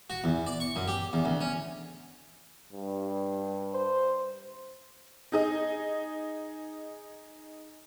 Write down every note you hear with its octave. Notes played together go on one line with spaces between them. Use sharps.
F#4
E2
D5
C#6
F#2
G4
E2
D2
C#4
G2
C5
D#4 G#4 D#5